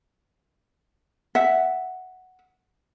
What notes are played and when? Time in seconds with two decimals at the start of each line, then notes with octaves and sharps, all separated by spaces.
1.35 E5 F#5